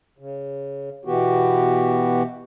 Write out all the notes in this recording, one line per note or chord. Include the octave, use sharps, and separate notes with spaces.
C#3
B2 E3 B3 F#4 G4